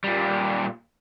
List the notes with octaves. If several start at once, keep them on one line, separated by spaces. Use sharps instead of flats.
A#2 G3